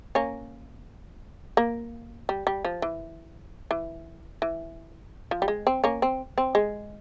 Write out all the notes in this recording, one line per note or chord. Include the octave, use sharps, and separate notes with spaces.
A#3 C#4
A#3
G3
G3
F3
E3
E3
E3
F3
G3
G#3
C4
A#3 C#4
C4
C4
G#3